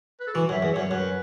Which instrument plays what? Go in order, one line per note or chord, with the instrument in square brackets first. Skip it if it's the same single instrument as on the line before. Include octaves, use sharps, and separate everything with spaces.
[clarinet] B4
A4
[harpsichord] E3 [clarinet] F#4
[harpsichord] F#2
[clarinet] E5
[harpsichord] E2
[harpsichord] F#2 [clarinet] C#5
[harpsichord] F#2 [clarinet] B4